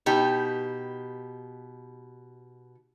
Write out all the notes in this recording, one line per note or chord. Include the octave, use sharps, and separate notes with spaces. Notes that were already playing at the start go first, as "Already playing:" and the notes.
B2 D#4 G4